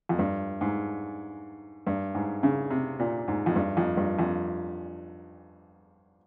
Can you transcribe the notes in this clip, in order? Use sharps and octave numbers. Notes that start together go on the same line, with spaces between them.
F2
G2
G#2
G2
G#2
C#3
C3
A#2
G#2
F2
G2
F2
G2
F2